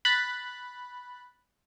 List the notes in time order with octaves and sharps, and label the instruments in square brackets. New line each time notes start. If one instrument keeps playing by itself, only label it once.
[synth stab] B5 F#6 A6